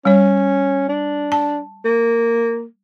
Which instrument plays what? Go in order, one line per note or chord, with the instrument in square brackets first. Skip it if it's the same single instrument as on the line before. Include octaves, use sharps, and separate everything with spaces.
[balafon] G3 C#5 [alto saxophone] C#4
[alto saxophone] D4
[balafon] A5
[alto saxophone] A#3